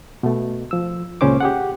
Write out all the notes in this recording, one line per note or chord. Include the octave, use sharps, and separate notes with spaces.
B2 A3
F3 E6
C#2 A#2 C#3 C#4 C5 D6
G4 G#4 F#5